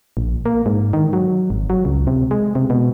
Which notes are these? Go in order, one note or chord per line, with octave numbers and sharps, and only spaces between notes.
A#1
A#3
G#2
D#3
F#3
G#1
F#3
C#2
C3
G#3
C3
B2